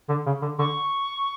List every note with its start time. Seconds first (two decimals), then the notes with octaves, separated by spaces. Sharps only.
0.09 D3
0.26 C#3
0.42 D3
0.59 D3 C#6